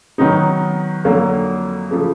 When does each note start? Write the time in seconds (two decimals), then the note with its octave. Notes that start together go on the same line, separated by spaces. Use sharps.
0.18 D#3 F#3 B3 D#4
1.05 F2 D3 F#3 A#3
1.91 C#3 F3 A3